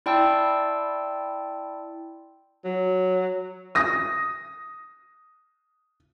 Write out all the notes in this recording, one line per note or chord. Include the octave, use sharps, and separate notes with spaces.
E4 D5 G5 A5 C6 E6
F#3
D#6 A#6